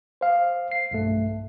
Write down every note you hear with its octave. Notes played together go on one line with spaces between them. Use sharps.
C5 F5
C7
B1 G2 A3